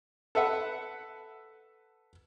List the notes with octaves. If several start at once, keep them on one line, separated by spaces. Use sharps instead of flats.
A4 B4 E5 F#5